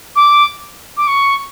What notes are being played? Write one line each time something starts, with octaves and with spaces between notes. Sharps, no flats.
D6
D6
C#6